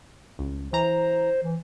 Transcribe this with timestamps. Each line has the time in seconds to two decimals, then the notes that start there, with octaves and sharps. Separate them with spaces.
0.39 C#2
0.73 E3 C5 A#5
1.43 E3